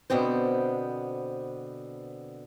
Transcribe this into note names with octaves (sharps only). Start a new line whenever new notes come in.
B2 D3 B3 C4 C5